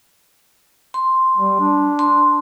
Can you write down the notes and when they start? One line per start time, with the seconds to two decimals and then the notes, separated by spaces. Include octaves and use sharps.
0.94 C6
1.37 G3
1.60 D4
1.99 C6